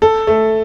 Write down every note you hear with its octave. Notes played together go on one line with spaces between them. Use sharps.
A4
A3